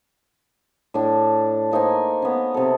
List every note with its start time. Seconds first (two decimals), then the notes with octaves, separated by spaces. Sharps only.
0.94 A2 D4
1.71 A#3 D#4 C5 G#5
2.22 B3 C#4
2.54 C3 A4